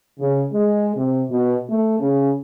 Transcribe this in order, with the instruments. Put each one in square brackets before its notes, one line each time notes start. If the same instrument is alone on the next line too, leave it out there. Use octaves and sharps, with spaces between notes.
[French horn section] C#3
G#3
C3
B2
A3
C#3